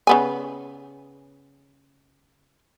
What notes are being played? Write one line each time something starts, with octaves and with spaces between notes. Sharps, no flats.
C#3 B3 G#5